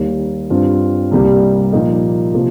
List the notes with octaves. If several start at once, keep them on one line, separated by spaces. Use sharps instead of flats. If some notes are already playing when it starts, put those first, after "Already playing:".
Already playing: D#2 D#3 G3 A#3
G2 G3 C4 F4
C2 C3 G3 A#3
A#2 F3 A#3 D#4
C3 F3 A#3